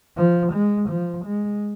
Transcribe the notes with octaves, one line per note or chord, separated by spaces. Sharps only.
F3
G#3
F3
G#3